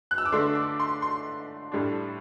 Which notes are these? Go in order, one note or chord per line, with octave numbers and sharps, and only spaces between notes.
F#6
E6
D6
D3 A3 D4 C6
D6
C6
C6
A2 G3 D4